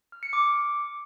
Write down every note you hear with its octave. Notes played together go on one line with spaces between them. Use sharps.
F6
C#7
D6